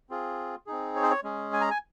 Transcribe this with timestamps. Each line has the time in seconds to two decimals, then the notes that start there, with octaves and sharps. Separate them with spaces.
0.10 C4 F4 G#4
0.66 C4 D#4 G#4
0.96 C#5
1.03 C5
1.10 C#5
1.23 G#3 C#4 G#4
1.53 G#5
1.61 A#5
1.71 G#5